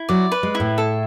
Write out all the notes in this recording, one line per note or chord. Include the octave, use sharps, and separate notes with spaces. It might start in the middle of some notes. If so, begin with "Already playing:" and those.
Already playing: E4
F#3 D5
B4
G#3
E4
A2
A4